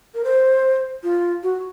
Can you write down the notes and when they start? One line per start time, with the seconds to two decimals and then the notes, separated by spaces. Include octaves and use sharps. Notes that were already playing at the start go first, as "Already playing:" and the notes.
0.15 A#4
0.24 C5
1.03 F4
1.43 F#4